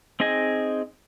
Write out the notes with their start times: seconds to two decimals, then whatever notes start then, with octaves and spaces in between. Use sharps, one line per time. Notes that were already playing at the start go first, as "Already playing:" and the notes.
0.20 C4 D#4 G#4 D#5 G#5